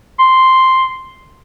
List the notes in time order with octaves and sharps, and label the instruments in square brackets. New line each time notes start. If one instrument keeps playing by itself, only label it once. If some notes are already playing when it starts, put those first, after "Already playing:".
[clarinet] C6